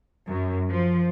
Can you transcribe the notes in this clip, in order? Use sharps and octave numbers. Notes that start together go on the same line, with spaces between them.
F#2
F3